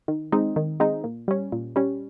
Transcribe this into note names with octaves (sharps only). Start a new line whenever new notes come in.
D#3
G#3 C4 D#4
D#3
G#3 C4 D#4
A#2
G3 C#4
A#2
G3 C#4